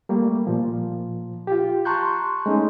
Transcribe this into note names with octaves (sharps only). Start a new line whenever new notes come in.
G3 A3 A#3
A#2 F3
F4 G4
A5 A#5 C6 C#6 F#6 G6
G#3 A3 C#4 D#4